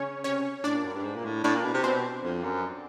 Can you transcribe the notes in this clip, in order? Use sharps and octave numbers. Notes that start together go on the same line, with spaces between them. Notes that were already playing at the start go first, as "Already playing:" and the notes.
Already playing: C#3 C#4 C#5
C3 C#4 C#5
A2 D4 D5
A#2
F#2
G2
G#2
A#2
A2
A2 D4 D5
A#2
B2
C3
B2 C4 C5
F2
F#2